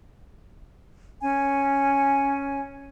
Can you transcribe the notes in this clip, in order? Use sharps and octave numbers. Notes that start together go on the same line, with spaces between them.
C#4 G#5